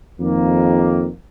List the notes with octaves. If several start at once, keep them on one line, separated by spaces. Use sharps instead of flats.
F2 D#3 A#3